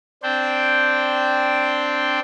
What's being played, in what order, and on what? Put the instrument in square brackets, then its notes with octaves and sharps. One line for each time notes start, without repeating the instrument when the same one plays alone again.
[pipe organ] C4 D4 C5 G5